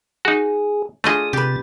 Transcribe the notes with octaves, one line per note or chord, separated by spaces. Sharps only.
D#4 F#4 G#4
A3 D4 F4 G#4 D#5 D#6
C3 G4 B4 A6